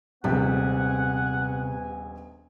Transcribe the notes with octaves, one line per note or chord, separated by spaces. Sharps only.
D#1 A#1 C3 G#3 B3 F#5 G#5